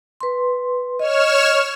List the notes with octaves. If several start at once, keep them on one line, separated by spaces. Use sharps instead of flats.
B4 C6
C#5 D#5 F6 E7